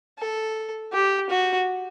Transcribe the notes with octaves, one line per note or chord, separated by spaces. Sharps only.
A4
G4
F#4